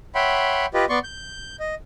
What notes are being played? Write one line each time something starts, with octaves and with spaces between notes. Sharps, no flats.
C#5 E5 F#5 G5 B5 C6
F4 G4 B4 D#5
B3 D5 C6 C#6
G6
D#5